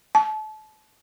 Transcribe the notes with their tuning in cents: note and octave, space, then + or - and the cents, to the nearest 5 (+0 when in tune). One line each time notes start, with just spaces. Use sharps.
A5 -30